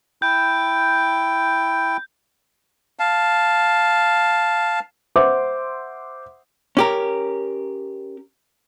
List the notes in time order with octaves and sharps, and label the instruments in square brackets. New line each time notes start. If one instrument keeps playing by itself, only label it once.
[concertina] E4 G5 [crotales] G6
[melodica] F5 A5
[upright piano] C5 E5 F#5 C6 D6
[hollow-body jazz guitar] C#4 G4 A#4